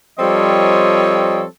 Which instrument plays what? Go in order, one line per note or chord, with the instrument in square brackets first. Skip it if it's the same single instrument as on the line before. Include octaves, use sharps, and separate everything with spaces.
[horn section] F3 G3 C4 A4 C#5 D#5